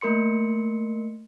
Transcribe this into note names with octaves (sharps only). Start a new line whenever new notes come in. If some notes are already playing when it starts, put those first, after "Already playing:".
A3 A#3 A#4 C6 C#7